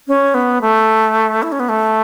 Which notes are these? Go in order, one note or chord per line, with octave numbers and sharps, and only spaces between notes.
C#4
B3
A3
E4
C#4
B3
A3